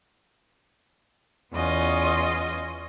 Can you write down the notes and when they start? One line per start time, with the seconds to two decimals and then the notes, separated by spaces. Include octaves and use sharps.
1.54 E2 B3 C#4 F4 D#5